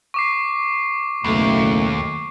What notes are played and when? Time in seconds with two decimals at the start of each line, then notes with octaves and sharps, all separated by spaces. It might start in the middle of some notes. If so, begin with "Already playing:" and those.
0.14 C#6 D6 C7
1.24 F#1 D#2 B2 A3